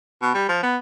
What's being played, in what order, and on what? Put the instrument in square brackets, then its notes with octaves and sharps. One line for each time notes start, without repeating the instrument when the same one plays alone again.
[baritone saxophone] B2
G3
F3
B3